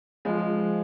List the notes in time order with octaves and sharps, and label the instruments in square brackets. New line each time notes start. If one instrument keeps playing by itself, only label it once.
[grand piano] F3 G#3